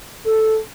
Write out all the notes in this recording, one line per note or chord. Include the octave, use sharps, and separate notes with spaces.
A4